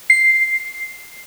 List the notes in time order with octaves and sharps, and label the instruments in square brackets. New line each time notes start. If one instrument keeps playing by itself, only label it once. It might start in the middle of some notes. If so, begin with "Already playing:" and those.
[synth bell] C7